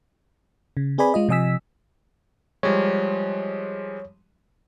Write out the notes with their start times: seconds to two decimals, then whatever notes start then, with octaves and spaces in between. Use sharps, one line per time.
0.77 C#3
0.98 C4 G#4 B4 D5 G#5 B5
1.14 G#3 F4 D#5
1.29 C3 F3 D#5 G#5 E6 B6
2.63 F3 G3 G#3 C#5